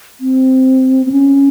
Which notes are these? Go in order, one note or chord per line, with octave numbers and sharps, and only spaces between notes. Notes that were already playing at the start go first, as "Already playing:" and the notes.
C4
C4
C#4